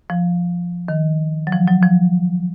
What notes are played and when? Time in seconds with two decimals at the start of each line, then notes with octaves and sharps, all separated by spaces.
0.10 F3
0.88 D#3
1.47 F#3
1.52 F3
1.68 F#3
1.83 F3